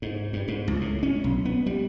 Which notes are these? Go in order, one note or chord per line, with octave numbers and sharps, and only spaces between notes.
G#2
G2
G#2
C#2
A2
C#4
B1
B3
G3